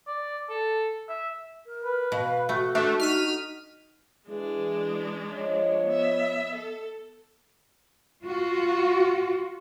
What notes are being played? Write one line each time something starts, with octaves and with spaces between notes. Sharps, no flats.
D5
A4
E5
A#4
B4
B2 F5
A3 F#4
A3 D4
D#4 F6 B6 D#7
E3 G#3 D4 G#4
F3 C#5 D#5
B3 E5
A4
F4 F#4